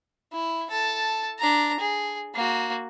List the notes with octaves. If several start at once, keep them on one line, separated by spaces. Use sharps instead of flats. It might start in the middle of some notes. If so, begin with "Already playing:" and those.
E4
A4 A5
D4 A#5
G#4
A#3 F#4